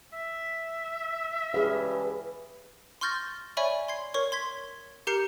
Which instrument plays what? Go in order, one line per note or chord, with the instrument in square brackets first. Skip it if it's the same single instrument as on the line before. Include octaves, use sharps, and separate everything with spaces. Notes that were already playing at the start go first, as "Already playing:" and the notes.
[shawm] E5
[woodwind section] G2 C#3 E3 [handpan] G#4 F5
[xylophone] C6 C#6 F6 G6 A6 A#6
C#5 D5 E5 G#5 B5 C#6
C6 G#6 C7
A#4 C#5 C#6
C6 G#6 B6
G4 A#4 A#5 G6 C7 C#7